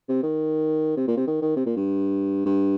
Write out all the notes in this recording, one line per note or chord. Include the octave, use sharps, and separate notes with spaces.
C3
D#3
C3
A#2
C3
D#3
D#3
C3
A#2
G2
G2